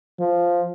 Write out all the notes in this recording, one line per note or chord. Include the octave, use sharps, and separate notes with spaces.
F3